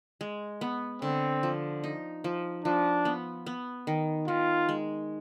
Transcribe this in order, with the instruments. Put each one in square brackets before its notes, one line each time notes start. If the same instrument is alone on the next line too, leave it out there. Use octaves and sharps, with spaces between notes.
[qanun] G#3
B3
[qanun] D3 [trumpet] C4
[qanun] F3
D#4
F3
[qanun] F3 [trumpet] D4
[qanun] B3
B3
D#3
[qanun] D#3 [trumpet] F4
[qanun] G#3